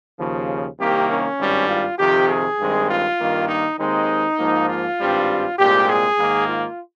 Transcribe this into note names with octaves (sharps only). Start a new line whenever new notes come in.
D#2 C#3 F3
C2 C3 D#3 A#3 G4
C#4
G#1 G2 G3
F4
F2 C3 D#3 G4
G#4
G2 D#3 G#3 C4
F4
G2 D#3 A#3
D#4
D#2 D#3 G#3 C4 D#4
G#2 F3 A#3
F4
G#1 G2 G3 C4
C2 A#2 G#3 C4 G4
G#4
G#2 D#3 A#3
F4